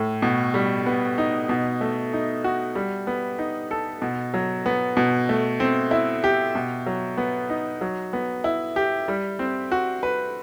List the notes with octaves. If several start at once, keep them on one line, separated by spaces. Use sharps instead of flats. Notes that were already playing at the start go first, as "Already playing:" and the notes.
Already playing: A2
B2
G3
B3
D#4
B2
A3
D#4
F#4
G3
B3
D#4
A4
B2
F#3
B3
B2
A3
C4
E4
G4
B2
F#3
B3
D#4
F#3
B3
E4
G4
G3
C4
F#4
B4